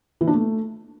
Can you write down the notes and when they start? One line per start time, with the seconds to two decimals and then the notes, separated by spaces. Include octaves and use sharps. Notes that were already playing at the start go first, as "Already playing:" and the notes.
0.21 E3
0.27 D4
0.34 A3